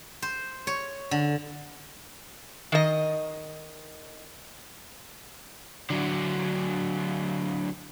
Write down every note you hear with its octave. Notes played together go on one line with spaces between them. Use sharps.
C5
C#5
D3
D#3 D#5
D3 F#3